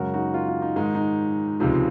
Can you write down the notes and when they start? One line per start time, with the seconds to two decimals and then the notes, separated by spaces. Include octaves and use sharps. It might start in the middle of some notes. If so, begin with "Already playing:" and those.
Already playing: F#2 C#3 G#3 F#4 A#4
0.14 D#4 F#4
0.34 F4
0.48 F4
0.62 D#4
0.76 G#2 D#3 G#3 D#4
0.95 D#4
1.60 C#2 C3 F3 G#3 D#4